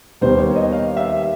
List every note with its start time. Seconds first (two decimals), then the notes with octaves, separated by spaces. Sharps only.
0.21 D#2 D#3 G3 B3 C5
0.38 C#5
0.56 D#5
0.73 F5
0.97 E5